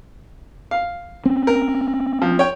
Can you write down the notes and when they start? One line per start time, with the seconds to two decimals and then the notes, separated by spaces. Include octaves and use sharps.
0.71 F5
1.25 C4 C#4
1.47 A#4
2.22 F3
2.39 C#5 G5